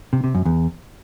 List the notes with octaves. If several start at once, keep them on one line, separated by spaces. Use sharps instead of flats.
C3
C3
F#2
E2